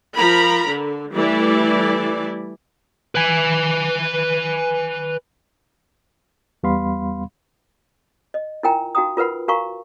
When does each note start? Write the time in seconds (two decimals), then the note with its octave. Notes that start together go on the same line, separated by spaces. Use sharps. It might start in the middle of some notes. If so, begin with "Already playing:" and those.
0.16 F3 A#4 A#5 B5
0.70 D3
1.13 E3 G3 A3 E4 D5
3.15 B4 G#5
6.63 E2 G3 B3 F5 B5 C6
8.34 D#5
8.63 E4 F4 A#4 G5 G#5 A#5
8.95 D#4 F#4 F5 G5 A#5 D#6
9.17 F4 A#4 B4 F#5 B5
9.48 F#4 A#4 F5 G#5 A#5 C#6